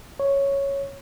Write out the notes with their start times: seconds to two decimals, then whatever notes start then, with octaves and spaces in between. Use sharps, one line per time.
0.20 C#5